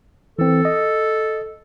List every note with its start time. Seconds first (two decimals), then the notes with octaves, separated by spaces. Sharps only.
0.39 E3 C4 A4
0.65 D#5